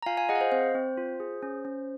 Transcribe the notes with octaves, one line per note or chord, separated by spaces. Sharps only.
A#5
F4 F5 G#5
F5 G#5
G#4 D#5 F#5
F5
C5 D#5
C4 C5
C4
F4
G#4
C#4
C#4